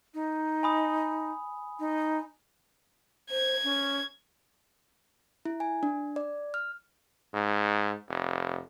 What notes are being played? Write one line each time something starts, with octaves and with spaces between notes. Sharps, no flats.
D#4
G#5 B5 D#6
D#4
C5 G#6
C#4
E4
G#5
D4
D5
F6
G#2
F1